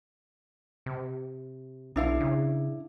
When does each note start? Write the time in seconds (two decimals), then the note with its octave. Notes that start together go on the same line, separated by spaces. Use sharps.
0.86 C3
1.96 B1 D4 E4 F5
2.20 C#3